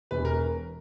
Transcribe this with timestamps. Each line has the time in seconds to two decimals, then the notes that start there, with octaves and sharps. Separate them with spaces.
0.11 E1 B4
0.25 A#4